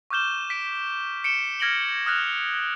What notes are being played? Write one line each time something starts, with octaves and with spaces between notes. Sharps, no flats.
C#6 D6 F6 G6 E7 G7
B6 D7
C#7 D7 E7 G7
F6 G#6 A#6 D7 F#7 G7
D#6 F6 F#6 A#6 E7 F7